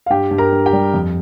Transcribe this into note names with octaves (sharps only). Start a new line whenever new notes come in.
F5
G2 G4 G5
G2
A#4 A#5
G2
G4 G5
G3
F2